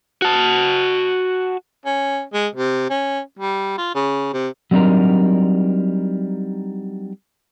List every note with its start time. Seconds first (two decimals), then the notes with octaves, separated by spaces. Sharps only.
0.22 F#4 A5
1.86 C#4
2.33 G#3
2.55 C3
2.90 C#4
3.39 G3
3.78 F4
3.95 C#3
4.33 C3
4.71 F#3 G3 C4 D4 D#4 A#4